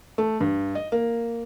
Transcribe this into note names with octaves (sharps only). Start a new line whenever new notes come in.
A3
G2
D#5
A#3